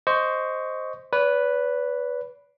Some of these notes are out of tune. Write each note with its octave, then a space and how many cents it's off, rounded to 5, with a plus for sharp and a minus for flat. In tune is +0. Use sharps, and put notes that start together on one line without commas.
C5 +0 D#5 +0 C#6 +15
B4 +0 D5 -45